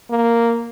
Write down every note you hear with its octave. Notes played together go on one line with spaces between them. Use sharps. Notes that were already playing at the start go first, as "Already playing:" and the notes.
A#3